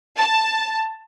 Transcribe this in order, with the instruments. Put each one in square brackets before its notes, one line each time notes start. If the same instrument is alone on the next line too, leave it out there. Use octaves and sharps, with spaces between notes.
[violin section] A5